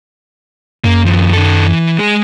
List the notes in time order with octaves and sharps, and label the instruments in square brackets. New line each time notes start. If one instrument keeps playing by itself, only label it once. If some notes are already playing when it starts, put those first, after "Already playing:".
[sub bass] F#2 [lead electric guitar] A#3
[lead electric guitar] D#2 F3
D#3 A4
E3
G#3 G#4